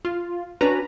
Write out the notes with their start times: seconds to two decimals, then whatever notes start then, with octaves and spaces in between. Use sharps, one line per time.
0.05 F4
0.61 C#4 D4 F#4 B4 A#5